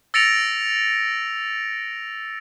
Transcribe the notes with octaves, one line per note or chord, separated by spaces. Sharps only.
E6 A6 A#6 C#7 D7 F7